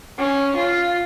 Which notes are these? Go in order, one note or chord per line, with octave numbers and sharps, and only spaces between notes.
C#4
F4